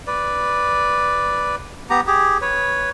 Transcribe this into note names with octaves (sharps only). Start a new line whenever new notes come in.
B4 D5
B3 G4 A#5
G4 G#4
B4 C#5